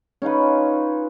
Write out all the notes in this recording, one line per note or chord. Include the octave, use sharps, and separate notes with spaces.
C#4 D#4 F4 B4